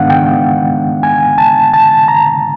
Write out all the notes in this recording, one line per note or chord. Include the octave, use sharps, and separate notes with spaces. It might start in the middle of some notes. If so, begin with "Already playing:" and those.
Already playing: G#2 D#3 G#3 B3 D4 F5 F#5
G5
G#5
A5
A5
A#5